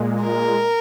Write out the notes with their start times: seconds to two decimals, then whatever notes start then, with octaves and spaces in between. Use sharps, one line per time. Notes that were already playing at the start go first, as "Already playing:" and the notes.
Already playing: A#2 G#3
0.22 A#4